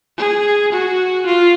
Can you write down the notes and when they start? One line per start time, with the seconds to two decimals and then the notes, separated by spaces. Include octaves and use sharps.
0.18 G#4
0.72 F#4
1.26 F4